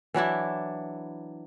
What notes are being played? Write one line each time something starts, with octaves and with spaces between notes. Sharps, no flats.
E3 F#3 D4 E4